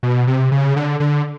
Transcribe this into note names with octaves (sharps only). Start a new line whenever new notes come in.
B2
C3
C#3
D3
D3